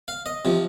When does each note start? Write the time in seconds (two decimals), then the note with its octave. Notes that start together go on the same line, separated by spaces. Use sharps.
0.08 F5
0.26 D#5
0.45 C3 F3